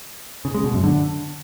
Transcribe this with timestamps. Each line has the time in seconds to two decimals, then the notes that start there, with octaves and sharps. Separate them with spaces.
0.45 C#3
0.55 G#3
0.64 B2
0.74 F#2
0.84 D3